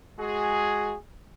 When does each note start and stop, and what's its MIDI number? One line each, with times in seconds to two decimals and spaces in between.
0.19 0.95 56
0.19 0.95 66
0.19 0.95 68